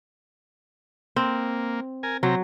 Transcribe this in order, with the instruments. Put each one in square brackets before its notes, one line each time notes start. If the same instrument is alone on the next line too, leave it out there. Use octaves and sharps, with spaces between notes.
[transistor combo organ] A#3 [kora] C4
[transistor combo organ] A#4 G#5
[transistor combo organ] C3 C4 A#5 [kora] F#3